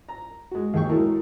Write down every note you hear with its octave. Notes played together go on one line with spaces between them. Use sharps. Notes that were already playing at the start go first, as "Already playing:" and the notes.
A#5
G#3 F#4
D#2 G#4 G5 C#6
A2 F#3 G#3 A3 E4 A#4